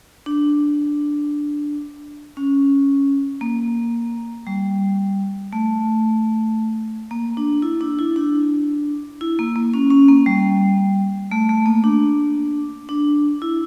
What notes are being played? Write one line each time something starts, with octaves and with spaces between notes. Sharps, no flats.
D4
C#4
A#3
G3
A3
A#3
D4
E4
D4
E4
D4
E4
A#3
A#3
C#4
C#4
A#3
G3
A3
A3
A#3
D4
D4
E4